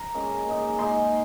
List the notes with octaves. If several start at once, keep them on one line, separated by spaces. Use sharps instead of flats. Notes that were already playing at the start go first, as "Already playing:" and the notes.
Already playing: A#5
A#2 G#3 C#4
A#2 G#3 D#4
A#2 G#3 D#4 C6